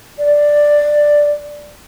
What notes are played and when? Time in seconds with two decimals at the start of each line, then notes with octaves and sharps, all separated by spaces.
0.18 D5